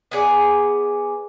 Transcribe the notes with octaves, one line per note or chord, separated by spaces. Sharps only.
B3 G#4 D5